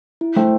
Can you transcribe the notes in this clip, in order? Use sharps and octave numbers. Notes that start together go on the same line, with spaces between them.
E4
A3 C5 G5